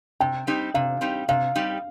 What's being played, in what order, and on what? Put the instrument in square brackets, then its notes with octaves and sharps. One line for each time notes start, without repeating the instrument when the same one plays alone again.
[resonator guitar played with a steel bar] C3 [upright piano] G5
[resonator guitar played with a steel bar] G3 C4 D#4 G4
[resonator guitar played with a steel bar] C3 [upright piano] F5
[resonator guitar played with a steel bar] G3 C4 D#4 G4
[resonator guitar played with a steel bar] C3 [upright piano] F5
[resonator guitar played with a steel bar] G3 C4 D#4 G4